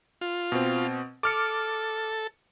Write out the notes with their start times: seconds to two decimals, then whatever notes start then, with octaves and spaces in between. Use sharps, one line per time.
0.21 F4
0.52 B2 C4
1.23 A4 D6 F6 C#7